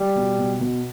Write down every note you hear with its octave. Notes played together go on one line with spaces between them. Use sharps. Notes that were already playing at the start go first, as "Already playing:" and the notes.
Already playing: G3
B2
B2
B2